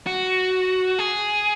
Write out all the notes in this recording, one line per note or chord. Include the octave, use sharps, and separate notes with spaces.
F#4
G#4